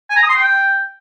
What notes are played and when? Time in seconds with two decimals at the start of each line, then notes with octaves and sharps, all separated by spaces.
0.10 G#5
0.17 A#5
0.23 D#6
0.29 C6
0.36 G5